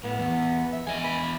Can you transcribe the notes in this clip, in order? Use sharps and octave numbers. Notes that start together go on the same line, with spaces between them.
A2 B3
E2
E5
E2 D#5 G#5
B5